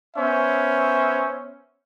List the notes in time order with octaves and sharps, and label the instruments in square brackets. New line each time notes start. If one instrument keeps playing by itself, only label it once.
[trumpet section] B3 C#4 C5 E5